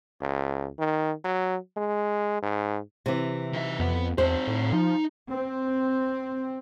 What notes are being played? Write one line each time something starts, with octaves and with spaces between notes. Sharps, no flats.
C#2
D#3
F#3
G#3
G#2
C3 E3
D#3 E5
F2 B3
E2 C4 G#4 C5
A2
F3 D#4
C4